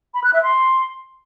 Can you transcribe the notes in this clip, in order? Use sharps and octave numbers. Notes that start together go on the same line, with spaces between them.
B5
F#6
E5
C6